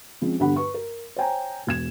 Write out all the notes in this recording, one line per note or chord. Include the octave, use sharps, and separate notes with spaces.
F3 G#3 C4 C#4
E2 G2 D3 G4 F#5 B5
B4 C#6
A#4
C5 C#5 G5 G#5 A#5
E1 G#6 E7